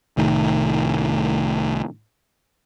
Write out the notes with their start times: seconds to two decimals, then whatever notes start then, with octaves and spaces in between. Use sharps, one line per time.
0.17 C2 A2 D#3